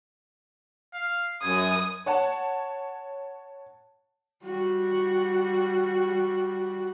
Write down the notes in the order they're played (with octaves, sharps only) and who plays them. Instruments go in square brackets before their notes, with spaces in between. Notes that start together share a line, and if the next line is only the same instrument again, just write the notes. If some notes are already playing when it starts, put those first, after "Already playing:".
[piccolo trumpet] F5
[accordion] F#2 [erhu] D#6 [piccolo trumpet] G#6
[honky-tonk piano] C#5 F#5 A5
[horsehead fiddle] G3 F#4